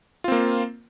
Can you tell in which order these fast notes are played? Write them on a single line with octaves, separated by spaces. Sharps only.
F4 C4 A#3